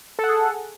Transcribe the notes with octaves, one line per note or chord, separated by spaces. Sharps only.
G#4 A4 F#5